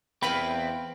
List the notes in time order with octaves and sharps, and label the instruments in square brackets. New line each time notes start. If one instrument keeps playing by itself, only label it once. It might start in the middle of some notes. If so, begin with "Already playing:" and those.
[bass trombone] E2 [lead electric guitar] C4 E4 [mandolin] B4 F5 G5 [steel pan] B5